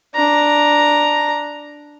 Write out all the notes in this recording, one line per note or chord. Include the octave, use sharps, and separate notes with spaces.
D4 A#5